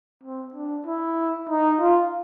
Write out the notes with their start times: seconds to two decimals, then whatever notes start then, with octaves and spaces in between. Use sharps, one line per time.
0.23 C4
0.54 D4
0.86 E4
1.50 D#4
1.81 F4